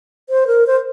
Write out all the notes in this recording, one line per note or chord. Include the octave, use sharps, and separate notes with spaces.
C5
A#4
C5